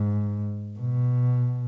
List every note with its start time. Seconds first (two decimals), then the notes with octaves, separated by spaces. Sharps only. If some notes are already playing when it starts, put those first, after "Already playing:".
Already playing: G#2
0.79 B2